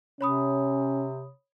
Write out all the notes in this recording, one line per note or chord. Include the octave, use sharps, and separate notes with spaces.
C3 C#4 C#5 B5 D#6